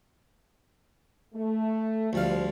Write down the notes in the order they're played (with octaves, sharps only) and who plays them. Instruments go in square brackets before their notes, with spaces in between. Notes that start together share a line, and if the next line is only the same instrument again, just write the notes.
[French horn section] A3
[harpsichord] D2 G3 F5 [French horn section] F3